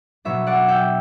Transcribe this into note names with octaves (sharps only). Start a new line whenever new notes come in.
B2 F#3 B3 D4 C#5 E5
D5 F#5
E5 G5